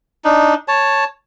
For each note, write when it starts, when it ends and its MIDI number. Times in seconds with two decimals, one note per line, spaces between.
0.25 0.54 62
0.25 0.54 63
0.68 1.05 73
0.68 1.05 81